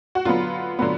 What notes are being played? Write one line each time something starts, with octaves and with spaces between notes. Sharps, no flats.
F#4
D3 F#3 B3 F4
D3 F#3 B3